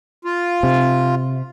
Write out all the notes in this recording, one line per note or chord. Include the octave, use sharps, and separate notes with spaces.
F4
C3